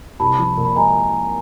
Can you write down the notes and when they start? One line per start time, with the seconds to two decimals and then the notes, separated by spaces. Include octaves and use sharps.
0.20 C2 A5 B5
0.39 F3
0.57 A#2
0.65 B5
0.76 G#3 G#5 A#5